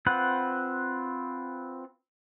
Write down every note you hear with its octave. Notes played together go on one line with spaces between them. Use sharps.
C4 F4 B4 F#5